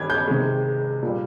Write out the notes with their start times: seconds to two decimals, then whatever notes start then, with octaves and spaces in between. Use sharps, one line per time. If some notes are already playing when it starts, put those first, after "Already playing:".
Already playing: G2 D#3 G3 G#6
0.10 G6
0.28 C3 D#3 G#3
1.03 A#2 G3